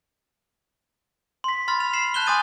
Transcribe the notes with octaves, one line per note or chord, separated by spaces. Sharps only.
C6 B6
B5 C6 F6 A6
F7
C7 E7 F#7
A5 F#6 G6 E7 G7
G#5 C6 D6 D#6 A6 D#7